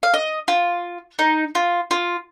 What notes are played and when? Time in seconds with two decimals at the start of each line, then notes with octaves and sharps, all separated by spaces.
0.03 F5
0.14 D#5
0.48 F4
1.19 D#4
1.55 F4
1.91 F4